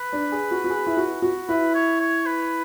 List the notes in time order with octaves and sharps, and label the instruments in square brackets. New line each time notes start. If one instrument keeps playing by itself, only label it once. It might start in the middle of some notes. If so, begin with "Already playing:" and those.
Already playing: [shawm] B4
[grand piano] D4
G#4
F#4
F#4
G#4
E4
F#4
F#4
[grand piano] E4 [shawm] B4
[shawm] C#5
C#5
B4